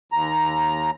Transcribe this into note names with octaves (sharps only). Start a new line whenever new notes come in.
D#2 A#5